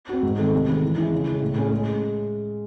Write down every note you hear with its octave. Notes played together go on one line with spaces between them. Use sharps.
C4 F#4
G#2
D#3 A3 C4
C3
D#3 G#3 C#4
E3
G#3 C#4 E4
C#3
G#3 C#4
A2
G#3 C#4 G#4
G#3